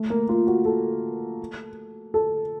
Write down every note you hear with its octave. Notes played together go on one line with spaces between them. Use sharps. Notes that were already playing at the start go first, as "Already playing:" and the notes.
Already playing: A3
A#3
F4
F#4
A4
A4